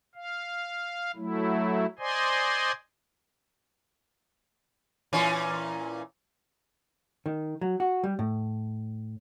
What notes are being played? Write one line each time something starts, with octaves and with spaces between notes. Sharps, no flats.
F5
F#3 A3 E4
C5 D5 D#5 G#5 C6
A#2 E3 C#4
D#3
F#3
F#4
G3
A2